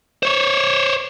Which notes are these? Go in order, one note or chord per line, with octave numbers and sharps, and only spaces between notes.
C5 C#5